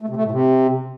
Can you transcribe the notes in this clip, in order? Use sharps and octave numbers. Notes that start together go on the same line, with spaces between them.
A3
C3
A3
A2
C3